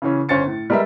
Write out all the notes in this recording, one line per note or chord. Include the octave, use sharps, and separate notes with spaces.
C#3 E3 C#4
G1 C#4 C5 A6 C#7
A2
G3 G#3 A#4 B4 E5